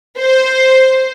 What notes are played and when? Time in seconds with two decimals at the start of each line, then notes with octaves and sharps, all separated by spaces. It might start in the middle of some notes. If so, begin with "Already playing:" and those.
0.19 C5